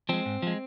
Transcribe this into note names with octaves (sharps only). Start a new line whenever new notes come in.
F3 G#3 C4
G#2
F3 G#3